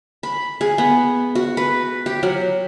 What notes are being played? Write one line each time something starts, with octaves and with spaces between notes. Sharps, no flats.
B5
G#4
B3
F#4
B4
G4
F#3